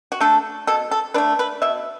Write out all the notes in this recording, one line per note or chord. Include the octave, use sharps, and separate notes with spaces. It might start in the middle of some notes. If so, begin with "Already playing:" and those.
F#4
A3 D4 A4
B2 A4
A4
A3 D4 B4
B4
B2 E5